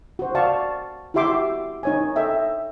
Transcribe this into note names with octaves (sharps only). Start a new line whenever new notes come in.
F#4 C5
D5 F5 A5 C#6
E4 F#4 G4 E5 C6 D6
D#4 C#5 G#5
A4 D#5 E5 G5